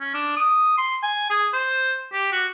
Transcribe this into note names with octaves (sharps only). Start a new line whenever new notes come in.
C#4
D4
D#6
C6
G#5
G#4
C5
G4
F#4